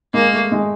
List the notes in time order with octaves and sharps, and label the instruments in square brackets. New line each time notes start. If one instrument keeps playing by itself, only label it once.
[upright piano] G#3 [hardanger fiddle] A#3
[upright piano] A3
G#3